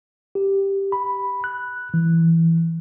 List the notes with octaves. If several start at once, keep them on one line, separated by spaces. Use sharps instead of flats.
G4
B5
F#6
E3